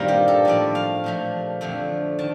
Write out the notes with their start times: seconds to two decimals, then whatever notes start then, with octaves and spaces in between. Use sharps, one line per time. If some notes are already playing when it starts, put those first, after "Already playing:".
Already playing: G2 A#2 D#3 G3 A#3 C4 D#4 F4
0.08 G4
0.28 A4
0.45 A2 F3 A3 D5
0.75 F5
1.04 A#2 F3 A3
1.61 F2 D3 F3 A3
2.19 D#3 A5